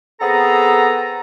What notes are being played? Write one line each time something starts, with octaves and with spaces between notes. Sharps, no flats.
B3 C4 G#4 A4 A#5